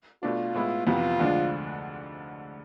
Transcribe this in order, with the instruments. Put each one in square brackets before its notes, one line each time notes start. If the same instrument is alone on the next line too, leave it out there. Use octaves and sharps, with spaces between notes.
[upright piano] B2 A3 D4 [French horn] F4
[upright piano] A2 G#3 B3 E4
[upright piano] F2 C3 E3 B3 [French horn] F4
[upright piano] D2 D3 F3 G#3 D4